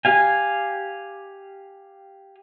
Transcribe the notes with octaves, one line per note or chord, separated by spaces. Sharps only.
G4 F5 G#5